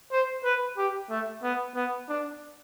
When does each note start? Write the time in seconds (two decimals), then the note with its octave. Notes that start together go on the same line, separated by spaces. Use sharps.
0.12 C5
0.44 B4
0.77 G4
1.10 A3
1.43 B3
1.75 B3
2.09 D4